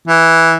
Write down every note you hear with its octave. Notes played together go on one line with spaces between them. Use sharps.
E3